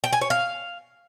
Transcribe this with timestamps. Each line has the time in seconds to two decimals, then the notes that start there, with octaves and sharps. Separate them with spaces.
0.04 G5
0.13 G#5
0.21 C#5
0.30 F5